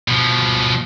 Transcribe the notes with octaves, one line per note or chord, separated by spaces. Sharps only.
B2 F3